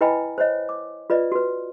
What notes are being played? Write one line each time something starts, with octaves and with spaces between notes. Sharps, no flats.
E4 B4 D#5 G5 G#5 B5
C5 C#5 D#5
D6
F4 B4 D5 D#5
F#4 B4